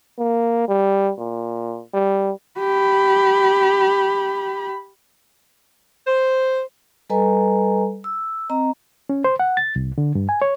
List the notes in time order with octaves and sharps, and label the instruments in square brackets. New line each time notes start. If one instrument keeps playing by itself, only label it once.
[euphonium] A#3
G3
A#2
G3
[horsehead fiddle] G4 B5
[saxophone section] C5
[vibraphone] G3 A4 B4 D#5 G#5 A#5
E6
C4 D#5 A#5
[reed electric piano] C#4
C5
F#5
A6
C2
D3
G2
G#5
C#5